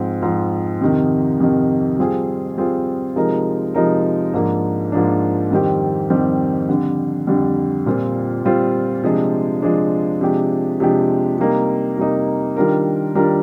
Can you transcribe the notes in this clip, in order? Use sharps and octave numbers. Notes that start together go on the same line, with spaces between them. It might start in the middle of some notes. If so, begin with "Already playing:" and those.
Already playing: G#2 F3 C4
G#2 F3 C4
F2 C3 D#3
F2 C3 D#3
G3 C4 F4 G#4
G3 C4 F4 G#4
C3 F3 G#3 D#4 A#4
C3 F3 G#3 D#4 A#4
G#2 F3 A#3 D4
G#2 F3 A#3 D4
F2 D#3 G3 C4 G4
F2 D#3 G3 C4 G4
F2 D3 G3
F2 D3 G3
A#2 G3 C4 F4
A#2 G3 C4 F4
C3 F3 G#3 D4
C3 F3 G#3 D4
C3 F3 G#3 D4 G4
C3 F3 G#3 D4 G4
C3 G3 A#3 D#4
C3 G3 A#3 D#4
D#3 G3 D4 F4 A#4
D#3 G3 D4 F4 A#4